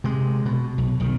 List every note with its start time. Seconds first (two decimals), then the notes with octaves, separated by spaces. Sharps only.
0.04 C3 G#3
0.45 B2
0.78 B1
1.00 B1 D#3